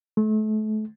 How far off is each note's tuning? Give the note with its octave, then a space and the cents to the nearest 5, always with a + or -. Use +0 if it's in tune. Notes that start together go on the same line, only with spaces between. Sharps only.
A3 -35